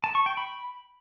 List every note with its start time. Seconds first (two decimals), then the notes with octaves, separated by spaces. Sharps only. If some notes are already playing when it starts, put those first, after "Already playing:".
0.04 A5
0.15 C#6
0.26 G5
0.37 B5